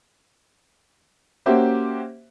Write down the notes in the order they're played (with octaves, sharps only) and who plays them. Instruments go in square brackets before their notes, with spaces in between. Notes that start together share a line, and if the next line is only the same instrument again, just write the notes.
[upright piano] A#3 C#4 F#4 G4 C5 E5